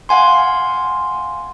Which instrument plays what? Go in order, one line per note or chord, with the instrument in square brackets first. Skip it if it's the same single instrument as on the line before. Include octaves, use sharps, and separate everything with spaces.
[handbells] F5 F#5 G#5 C6